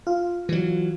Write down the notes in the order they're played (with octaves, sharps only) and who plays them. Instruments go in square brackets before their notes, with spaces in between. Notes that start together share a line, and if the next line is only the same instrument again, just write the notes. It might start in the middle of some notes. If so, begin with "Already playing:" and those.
[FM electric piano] F4
[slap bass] E3 F#3